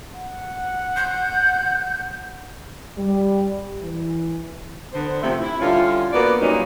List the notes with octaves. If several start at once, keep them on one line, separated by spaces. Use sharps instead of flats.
F#5
G6
G3
E3
D3 B3 C5
C3 F3 A3
E4
D3 G3 C#4 E4 F4
A#3 B3 F#4 B4 D5
A#2 F#3 G3 A#3 C#4 D#4